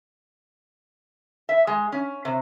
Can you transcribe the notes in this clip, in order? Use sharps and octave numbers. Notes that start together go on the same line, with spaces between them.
E5
G#3
C#4
C3